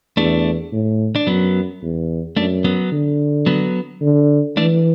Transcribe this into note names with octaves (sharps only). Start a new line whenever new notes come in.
E2 A3 D4
A2
D4
F#2 F#3 B3
E2
F#2 A3 D4
F#3 B3
D3
F#3 B3
D3
E3 A3 D4